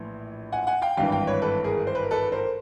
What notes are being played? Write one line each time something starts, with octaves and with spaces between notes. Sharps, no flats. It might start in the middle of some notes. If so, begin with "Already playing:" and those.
Already playing: A#1 A2 E3
F#5 G#5
F#5 G#5
F5 G5
G#1 G2 E3 F5 G5
F5 G5
B4 C#5
A4 B4
G#4 A#4
C5
B4
A#4
A4 B4
A#4 C5